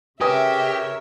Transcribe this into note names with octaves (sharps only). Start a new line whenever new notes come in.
C#3 G4 A#4 B4 C#5 E5 G#5 D#6